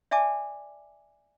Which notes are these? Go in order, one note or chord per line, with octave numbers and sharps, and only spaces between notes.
D5 E5 G#5 A5 D6